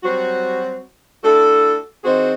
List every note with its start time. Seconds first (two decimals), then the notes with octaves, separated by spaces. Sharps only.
0.04 F#3 G3 C4 F#4
1.24 A3 D4 E4 F#4 A4
2.04 E3 C4 D#4 F#4 G#4 C5